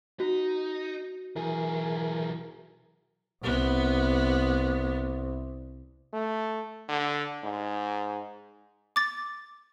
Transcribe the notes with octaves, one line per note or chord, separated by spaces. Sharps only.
D#4 F#4
B1 E3 G#4 A#4
C2 B3
A3
D3
G#2
D6 A6